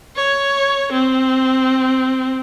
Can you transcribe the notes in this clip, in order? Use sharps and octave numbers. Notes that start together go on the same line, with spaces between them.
C#5
C4